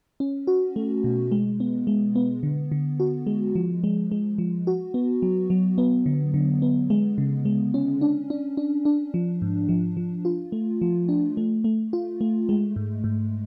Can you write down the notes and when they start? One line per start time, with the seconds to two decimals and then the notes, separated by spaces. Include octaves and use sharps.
0.20 C#4
0.47 F#4
0.76 A3
1.04 B2
1.32 G#3
1.60 B3
1.87 G#3
2.15 B3
2.43 D3
2.72 D3
3.00 F#4
3.27 G#3
3.55 F3
3.84 G#3
4.12 G#3
4.38 F3
4.67 F#4
4.94 B3
5.22 F#3
5.50 F#3
5.78 B3
6.06 D3
6.34 D3
6.62 B3
6.90 G#3
7.18 C#3
7.45 G#3
7.74 C#4
8.01 D4
8.30 D4
8.57 D4
8.85 D4
9.14 F3
9.42 G#2
9.69 F3
9.97 F3
10.25 F4
10.52 A3
10.81 F3
11.09 D4
11.37 A3
11.64 A3
11.93 F4
12.21 A3
12.49 G#3
12.76 G#2
13.04 G#2